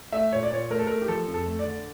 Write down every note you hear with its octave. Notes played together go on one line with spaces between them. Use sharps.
A3 E5
A#2 C#5
D5
A#2 C#5
A3 A#4
A4
A3 A#4
G4
F3 A4
F2
A4
A3
D5
D3